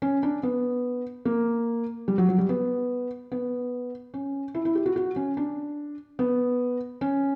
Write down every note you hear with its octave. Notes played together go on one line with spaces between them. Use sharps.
C#4
D4
B3
A#3
G3
F#3
F#3
G3
B3
B3
C#4
E4
E4
G4
F#4
F#4
C#4
D4
B3
C#4